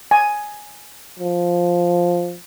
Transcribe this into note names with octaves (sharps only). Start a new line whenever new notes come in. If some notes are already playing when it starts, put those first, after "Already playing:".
G#5
F3